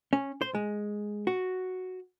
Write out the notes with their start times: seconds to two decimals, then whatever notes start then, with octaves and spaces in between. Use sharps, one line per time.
0.13 C#4
0.41 C5
0.55 G#3
1.27 F#4